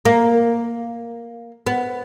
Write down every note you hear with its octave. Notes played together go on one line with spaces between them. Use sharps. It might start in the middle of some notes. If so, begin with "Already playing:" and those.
A#3
B3